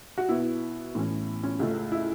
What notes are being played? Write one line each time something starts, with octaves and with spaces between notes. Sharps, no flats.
F#4
B2 B3 E4
A2 E3 C#4
C#4
C#2 C#3 A3 C#4
E4